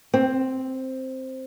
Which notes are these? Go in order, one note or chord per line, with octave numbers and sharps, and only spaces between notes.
C4